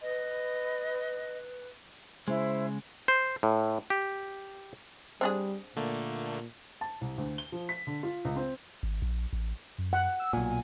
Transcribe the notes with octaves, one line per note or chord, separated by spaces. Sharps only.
B4 D#5
C#3 G#3 E4 C5
C5
A2
G4
G3 C4 D4 G#4 C5 F#5
A#2 D3 A3 A#3
A5
C2
D2
G7
F3
B6
D3
F4
C#2
C4
G#1
A#1
A1
F#2
F#5
E6
B1 A#2 G#5